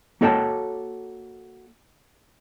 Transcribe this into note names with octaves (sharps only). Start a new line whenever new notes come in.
A#3 F#4 A4 C#5 G5 A5